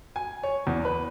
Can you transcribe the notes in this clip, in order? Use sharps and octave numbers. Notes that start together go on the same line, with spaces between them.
G#5
C#5
E2
B4